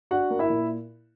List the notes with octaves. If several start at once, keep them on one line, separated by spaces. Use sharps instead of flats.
D4 F#4 F#5
A#3
E4 E5
A#2